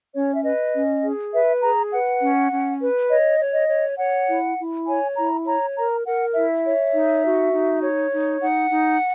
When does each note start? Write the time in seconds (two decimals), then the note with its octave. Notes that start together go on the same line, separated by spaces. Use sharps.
0.14 C#4 C#5
0.34 E5
0.44 B4 D#5
0.74 C#4
1.03 G#4
1.32 B4 E5
1.62 G#4 A#5
1.91 B4 F#5
2.21 C#4
2.51 C#4
2.79 B4
3.09 C#5 D#5
3.39 C#5
3.54 D#5
3.68 C#5
3.98 C#5 F#5
4.28 E4
4.57 E4
4.86 C#5 G#5
5.16 E4 A#5
5.45 C#5 A#5
5.75 A#4 A#5
6.05 A#4 F#5
6.34 E4 E5
6.64 C#5
6.93 D#4
7.23 F#4
7.52 D#4
7.82 C#5
8.11 D#4
8.41 D#4 F#5
8.70 D#4